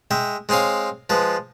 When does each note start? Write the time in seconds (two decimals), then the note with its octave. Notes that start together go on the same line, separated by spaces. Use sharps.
0.11 G#3 E5 G5
0.49 G#3 C4 G#4 C#5 F5
1.10 F3 G#3 B4